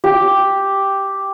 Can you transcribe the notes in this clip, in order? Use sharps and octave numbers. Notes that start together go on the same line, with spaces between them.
G4